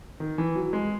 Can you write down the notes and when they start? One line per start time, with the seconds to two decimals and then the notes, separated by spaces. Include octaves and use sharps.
0.20 D#3
0.38 E3
0.55 F#3
0.73 G#3